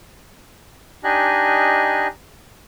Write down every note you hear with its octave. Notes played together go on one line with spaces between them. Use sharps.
D4 D#4 G4 D#5 G#5 F#6